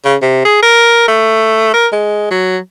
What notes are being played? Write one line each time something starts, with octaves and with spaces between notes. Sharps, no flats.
C#3
C3
G#4
A#4
A3
A#4
G#3
F#3